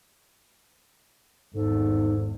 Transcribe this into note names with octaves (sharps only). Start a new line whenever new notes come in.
G#1 E2 G#2 D#4 A4